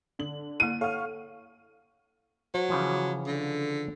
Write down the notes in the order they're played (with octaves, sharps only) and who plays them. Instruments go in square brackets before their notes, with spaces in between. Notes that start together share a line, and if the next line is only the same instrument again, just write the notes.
[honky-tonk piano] D3 F#7
[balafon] A#3 E4 [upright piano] D#7
[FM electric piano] A4 C#5 C#6 [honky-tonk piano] F5 F#5 F6
[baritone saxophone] F#3 [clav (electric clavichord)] C5
[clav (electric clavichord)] C#3 E3 F3
[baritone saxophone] D3